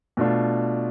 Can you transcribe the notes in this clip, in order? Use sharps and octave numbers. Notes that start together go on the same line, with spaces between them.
B2 A3 D4 F4